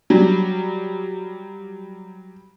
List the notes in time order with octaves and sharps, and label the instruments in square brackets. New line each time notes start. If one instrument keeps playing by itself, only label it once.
[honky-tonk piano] F#3 G3